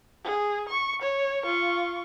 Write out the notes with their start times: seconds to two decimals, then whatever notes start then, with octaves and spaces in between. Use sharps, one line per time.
0.24 G#4
0.69 C#6
1.02 C#5
1.43 F4 C#6